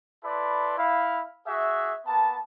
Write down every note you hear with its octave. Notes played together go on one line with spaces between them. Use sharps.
E4 A4 B4 D5 C6
E4 F5
F#4 G#4 E5
A#3 B3 A5